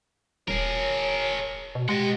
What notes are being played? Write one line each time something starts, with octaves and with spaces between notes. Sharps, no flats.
D#1 G#4 A#4 C#5
B2
G#3 G4 D#5 F#5